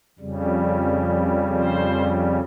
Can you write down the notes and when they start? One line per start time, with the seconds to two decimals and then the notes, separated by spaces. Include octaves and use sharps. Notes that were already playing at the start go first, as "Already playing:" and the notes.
0.19 F2 C#3 G3
1.56 C5